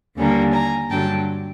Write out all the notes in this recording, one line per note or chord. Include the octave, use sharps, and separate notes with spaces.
D#2 D3 G3 A#3 C#4
G#5 A#5
G2 D3 F#3 G5 A5